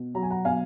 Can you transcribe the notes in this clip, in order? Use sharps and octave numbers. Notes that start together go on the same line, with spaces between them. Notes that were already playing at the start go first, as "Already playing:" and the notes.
Already playing: B2
F#3 A#5
G#5
F#5 A#5
B2 F5 G#5